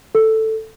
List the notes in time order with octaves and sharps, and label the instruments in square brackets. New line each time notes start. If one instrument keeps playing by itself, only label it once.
[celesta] A4